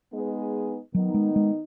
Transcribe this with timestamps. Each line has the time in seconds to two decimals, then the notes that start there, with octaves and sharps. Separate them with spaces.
0.12 G#3 B3 D#4 G#4 B4
0.94 D#3 F#3 B3 D#4
1.14 G#3
1.36 G#3